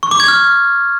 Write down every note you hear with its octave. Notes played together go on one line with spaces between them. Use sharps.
C#6
D6
G#6
F6